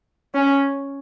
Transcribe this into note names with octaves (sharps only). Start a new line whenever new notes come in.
C#4